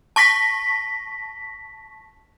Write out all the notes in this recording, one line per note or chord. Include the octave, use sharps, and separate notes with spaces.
A5 C#6 A#6 B6